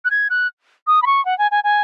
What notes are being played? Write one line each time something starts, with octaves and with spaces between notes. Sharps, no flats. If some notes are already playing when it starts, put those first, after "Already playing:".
F#6
G#6
F#6
D#6
B5
C#6
F#5
G#5
G#5
G#5